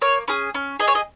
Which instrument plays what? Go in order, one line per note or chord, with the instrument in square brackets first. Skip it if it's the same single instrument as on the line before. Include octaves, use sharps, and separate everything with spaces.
[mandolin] A#3 C#5
C#4 G#4
C#4
G#4 D#5
C#5
D#5